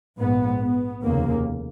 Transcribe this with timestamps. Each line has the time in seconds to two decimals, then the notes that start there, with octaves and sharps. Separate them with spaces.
0.18 A#1 G#2 B3
0.62 B3
1.03 F1 D#2 C#3 A#3